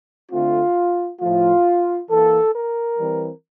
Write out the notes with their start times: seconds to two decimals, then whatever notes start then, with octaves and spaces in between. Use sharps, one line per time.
0.32 D3 A3 C4 F4
1.21 A2 F3 A3 F4
2.10 E3 A#3 A4
2.54 A#4
2.99 E3 G3 C4